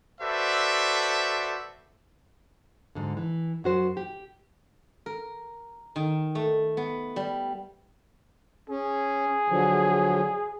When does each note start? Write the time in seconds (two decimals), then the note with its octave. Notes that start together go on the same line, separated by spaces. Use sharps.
0.21 F#4 A4 B4 C5 D5 E5
2.95 D2 G#2 D3
3.17 E3
3.64 F#2 F#4 C5
3.97 G4
5.06 A#4
5.96 D#3
6.35 A3
6.77 B3
7.16 G3
8.69 C#4 G#4
9.49 D3 F3 F#3